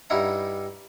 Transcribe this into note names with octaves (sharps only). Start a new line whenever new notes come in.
G2 G3 D#4 E4 F#5 A#5